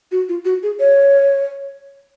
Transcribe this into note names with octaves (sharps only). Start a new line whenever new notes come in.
F#4
F4
F#4
G#4
C#5